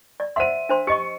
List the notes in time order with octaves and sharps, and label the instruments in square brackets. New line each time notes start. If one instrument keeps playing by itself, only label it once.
[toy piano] D5
[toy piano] C5 F#5 C6 [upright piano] E5 D#7
[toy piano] D4 C5 C6
[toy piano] G4 D#5 C#6 [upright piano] C#7